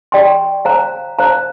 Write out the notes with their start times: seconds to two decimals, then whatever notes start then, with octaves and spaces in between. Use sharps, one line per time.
0.12 G4 D5 G5 C6
0.65 C5 F5 A#5
1.19 C5 F5 A#5